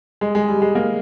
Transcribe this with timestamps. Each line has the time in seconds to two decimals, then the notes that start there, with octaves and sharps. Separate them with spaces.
0.21 G#3
0.35 G#3
0.48 G3
0.62 G#3
0.75 A#3